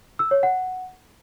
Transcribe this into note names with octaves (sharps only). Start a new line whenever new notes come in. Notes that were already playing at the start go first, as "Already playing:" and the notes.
E6
C#5
F#5